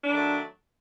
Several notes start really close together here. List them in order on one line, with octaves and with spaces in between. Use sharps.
D4 D#3 A3 F#3